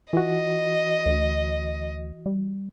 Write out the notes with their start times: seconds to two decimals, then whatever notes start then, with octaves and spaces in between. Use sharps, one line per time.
0.13 E3 F4 F#4 D#5
1.06 D2
2.26 G3